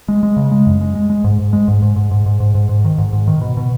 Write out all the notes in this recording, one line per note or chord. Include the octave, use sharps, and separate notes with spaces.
G#3
G#3
C#3
G#3
F#2
G#3
G#3
G#3
G#2
G#2
G#3
G#2
G#2
G#2
G#2
G#2
G#2
G#2
G#2
D#3
G#2
G#2
D#3
B2
B2